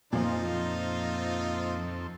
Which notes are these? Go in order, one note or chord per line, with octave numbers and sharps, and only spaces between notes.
F2 A#2 F3 C4 D#4 F4 A4 C5